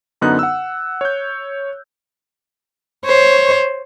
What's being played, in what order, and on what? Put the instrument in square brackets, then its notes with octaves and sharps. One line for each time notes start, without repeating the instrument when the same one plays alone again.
[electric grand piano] F#2 D3 B3 D#4 F#6
F#5 E6
C#5 G6
[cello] C5 C#5